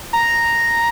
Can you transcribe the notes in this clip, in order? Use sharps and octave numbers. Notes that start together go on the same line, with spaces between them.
A#5